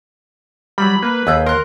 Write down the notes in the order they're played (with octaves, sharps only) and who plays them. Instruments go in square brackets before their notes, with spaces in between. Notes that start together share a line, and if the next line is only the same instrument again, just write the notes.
[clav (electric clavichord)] F#3 G3 [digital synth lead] B5
[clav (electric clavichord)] A#3 [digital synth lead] B4
[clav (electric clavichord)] D#2 [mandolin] G#4 E6 G6
[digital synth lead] A#4 [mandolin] C6 F#6